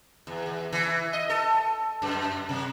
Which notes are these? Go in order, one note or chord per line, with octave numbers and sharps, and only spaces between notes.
E2
E2
E3
D#5
A4
F#2
C3